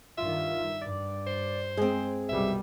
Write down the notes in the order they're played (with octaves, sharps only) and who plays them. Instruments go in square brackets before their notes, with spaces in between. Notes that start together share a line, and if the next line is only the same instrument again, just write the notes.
[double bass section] G2 D#3 [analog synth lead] F4 [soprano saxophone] E5
[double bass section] G2 [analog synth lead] D5
[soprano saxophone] C5
[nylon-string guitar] G#3 C4 [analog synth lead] G#4
[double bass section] C2 B2 G3 [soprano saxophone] E5